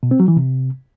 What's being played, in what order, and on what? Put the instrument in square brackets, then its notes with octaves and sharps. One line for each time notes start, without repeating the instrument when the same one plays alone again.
[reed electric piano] B2
C4
F#3
E3
C3